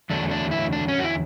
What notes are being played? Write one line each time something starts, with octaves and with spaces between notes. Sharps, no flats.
E2 D3 F#3 A3 D4
D4
E4
D4
C#4
F#4
E4